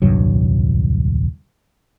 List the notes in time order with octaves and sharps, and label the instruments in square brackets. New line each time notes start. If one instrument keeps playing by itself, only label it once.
[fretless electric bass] D#1 C2 G2 F#3